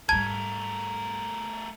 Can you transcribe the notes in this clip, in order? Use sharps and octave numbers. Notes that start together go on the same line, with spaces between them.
G#2 G3 A3 A#4 A5 G#6